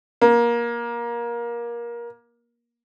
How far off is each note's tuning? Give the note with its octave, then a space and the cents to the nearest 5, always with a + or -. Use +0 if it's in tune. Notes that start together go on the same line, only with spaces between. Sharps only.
A#3 +20